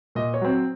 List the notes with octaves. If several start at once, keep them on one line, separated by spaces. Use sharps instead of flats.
A#2 D#5
C#5
F#3 C4